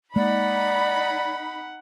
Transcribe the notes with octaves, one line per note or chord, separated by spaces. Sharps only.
G#3 A#3 D#4 D5 F#5 B5